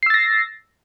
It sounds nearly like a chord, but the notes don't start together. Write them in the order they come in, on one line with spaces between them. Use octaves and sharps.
C7 E6 A6 A#6